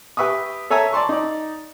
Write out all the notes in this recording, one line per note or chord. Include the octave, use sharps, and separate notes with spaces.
G4 B4 E5 C#6 D#6
A4 C#5 E5 G#5 A#5
D5 A5 C6 C#6
D#4 D5